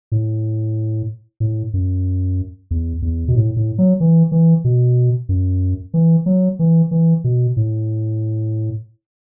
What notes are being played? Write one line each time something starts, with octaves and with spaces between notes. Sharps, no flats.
A2
A2
F#2
E2
E2
B2
A2
A2
F#3
E3
E3
B2
F#2
E3
F#3
E3
E3
B2
A2